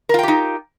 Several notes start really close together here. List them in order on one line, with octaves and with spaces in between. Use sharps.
A#4 F4 G5 G4 D#4